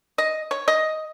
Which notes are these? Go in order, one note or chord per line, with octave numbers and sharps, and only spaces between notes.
D#5
C#5
D#5